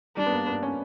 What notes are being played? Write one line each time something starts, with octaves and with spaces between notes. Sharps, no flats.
G3 D4
B3
A#3
B3
C#4